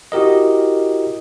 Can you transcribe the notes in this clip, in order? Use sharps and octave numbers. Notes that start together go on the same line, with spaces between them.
E4 F#4 G4 A#4 D#5